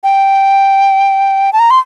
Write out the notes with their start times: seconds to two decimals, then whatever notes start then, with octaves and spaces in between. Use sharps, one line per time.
0.04 G5
1.53 A5
1.59 A#5
1.71 C6